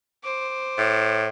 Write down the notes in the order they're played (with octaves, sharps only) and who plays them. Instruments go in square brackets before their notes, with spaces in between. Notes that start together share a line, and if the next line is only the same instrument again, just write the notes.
[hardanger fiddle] C5 D6
[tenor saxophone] A2